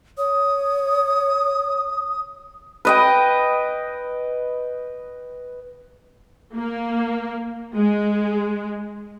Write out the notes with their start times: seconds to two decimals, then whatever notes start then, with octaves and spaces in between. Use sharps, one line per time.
0.18 C#5 D#6
2.85 B4 D#5 G5
6.55 A#3
7.76 G#3